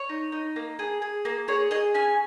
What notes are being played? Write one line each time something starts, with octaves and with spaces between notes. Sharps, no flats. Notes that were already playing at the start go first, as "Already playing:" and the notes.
Already playing: C#5
D#4
D#4
A#3
G#4
G#4
A#3
G#4 C#5
G#4 D#5
C#4 G#5